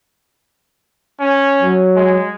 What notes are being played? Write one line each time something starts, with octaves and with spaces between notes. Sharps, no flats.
C#4
F#3
G#3